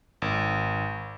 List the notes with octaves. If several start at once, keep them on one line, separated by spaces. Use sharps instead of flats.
G#1